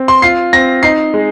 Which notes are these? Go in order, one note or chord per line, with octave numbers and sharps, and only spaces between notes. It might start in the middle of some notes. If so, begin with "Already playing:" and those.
Already playing: C4
C6
F4 C7
C4 A#6
D#4 C7
G#3